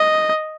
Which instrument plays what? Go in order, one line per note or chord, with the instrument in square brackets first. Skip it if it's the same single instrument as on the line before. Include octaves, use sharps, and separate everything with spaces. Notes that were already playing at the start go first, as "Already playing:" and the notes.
Already playing: [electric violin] D#5